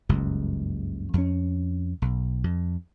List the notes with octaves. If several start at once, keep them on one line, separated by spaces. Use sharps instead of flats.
F#1 C#2 G2
F2 C#4
B1
F2